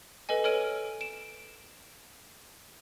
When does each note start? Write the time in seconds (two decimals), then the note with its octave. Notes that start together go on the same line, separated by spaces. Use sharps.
0.29 A4 B4 D#5 G#5
0.44 A4 C#5 F6 D7 D#7
1.01 D7 E7